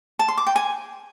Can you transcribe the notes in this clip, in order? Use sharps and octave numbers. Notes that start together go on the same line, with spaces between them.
A5
C6
D6
G5
G#5